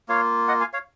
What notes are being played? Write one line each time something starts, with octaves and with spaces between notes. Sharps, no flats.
A#3 F4 C#5 F5
D#5 F#5
F5 G#5
C#5 F5